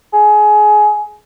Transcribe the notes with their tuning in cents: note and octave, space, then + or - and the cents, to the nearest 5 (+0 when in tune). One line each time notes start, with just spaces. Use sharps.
G#4 +20